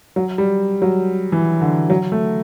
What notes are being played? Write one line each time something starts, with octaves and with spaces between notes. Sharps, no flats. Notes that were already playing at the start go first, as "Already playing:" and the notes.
F#3
G3
F#3
E3
D3
F#3
A3